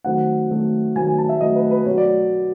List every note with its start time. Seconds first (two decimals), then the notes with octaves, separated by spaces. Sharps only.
0.04 D#3 F#3 A3 C4 F#5
0.50 D#3 F#3 A3 C4
0.96 D#3 F#3 A3 C4 G#5
1.07 G#5
1.18 A5
1.29 E5
1.41 D#3 F#3 A3 C4 D#5
1.56 B4
1.71 B4
1.85 B2 F#3 B3 C#5
1.98 D5